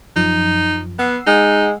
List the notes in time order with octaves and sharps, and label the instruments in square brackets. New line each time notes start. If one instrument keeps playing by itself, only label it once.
[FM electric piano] F#2 F3 [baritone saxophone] D#4
[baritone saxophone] B3 [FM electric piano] F#5 E6 C7
[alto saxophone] G#3 [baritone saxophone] D#4